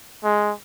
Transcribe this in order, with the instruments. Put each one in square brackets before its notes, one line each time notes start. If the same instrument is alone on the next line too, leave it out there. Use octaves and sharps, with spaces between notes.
[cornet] G#3